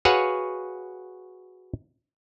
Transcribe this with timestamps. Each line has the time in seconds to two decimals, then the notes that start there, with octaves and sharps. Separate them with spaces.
0.05 F#4 G#4 B4 C#5 F5 F#5